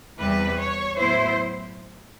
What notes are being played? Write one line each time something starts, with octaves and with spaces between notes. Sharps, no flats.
E2 C3 E3 G3 B4
C#5
A2 F#3 B3 E4 C5